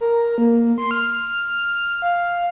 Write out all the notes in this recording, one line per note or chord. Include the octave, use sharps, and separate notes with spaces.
A#4
A#3
C6
F6
F5